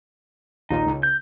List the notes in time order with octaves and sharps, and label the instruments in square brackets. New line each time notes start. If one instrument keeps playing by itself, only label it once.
[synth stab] A#1 D#2 A#2 [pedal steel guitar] D#4
[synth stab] C#2
[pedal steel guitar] G6